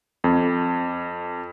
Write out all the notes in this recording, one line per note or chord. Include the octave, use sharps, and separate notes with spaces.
F2